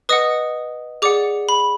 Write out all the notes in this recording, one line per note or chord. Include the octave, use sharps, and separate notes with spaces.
B4 D#5 F#5 D#6
G#4 D5 F#5 D6
B5